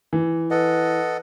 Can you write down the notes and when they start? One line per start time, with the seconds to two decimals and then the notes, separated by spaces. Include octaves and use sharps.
0.13 E3
0.51 A4 B4 D#5 F#5